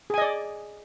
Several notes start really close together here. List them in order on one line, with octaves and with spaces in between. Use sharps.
G#4 G#5 D#5 D5